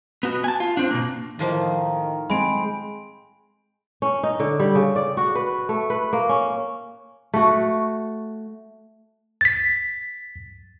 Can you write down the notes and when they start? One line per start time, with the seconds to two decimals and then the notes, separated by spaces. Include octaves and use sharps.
0.23 B3 F#4
0.44 G#5 A5
0.60 F4
0.77 C4 D4
0.91 B2 A#3
1.39 A2 D#3 F3 A#3
2.30 G#3 C4 B5 D7
4.02 C#4
4.23 D#4
4.40 D3
4.59 G3
4.75 C#3
4.96 D5
5.17 F#4
5.35 B4
5.69 A3
5.90 B4
6.13 A#3
6.29 C#4
7.34 A3 F#4
9.41 A6 B6